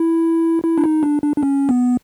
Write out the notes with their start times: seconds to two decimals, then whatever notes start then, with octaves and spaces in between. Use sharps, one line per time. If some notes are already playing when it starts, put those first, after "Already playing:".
Already playing: E4
0.64 E4
0.78 D4
0.84 D#4
1.03 D4
1.23 D4
1.36 D4
1.43 C#4
1.69 B3